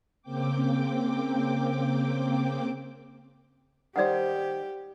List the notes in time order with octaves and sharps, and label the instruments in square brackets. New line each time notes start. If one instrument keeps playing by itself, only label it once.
[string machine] C#3 A#3 C4 G5 D6
[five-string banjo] D#3 G3 C5 [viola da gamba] G4 [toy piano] D5 F#5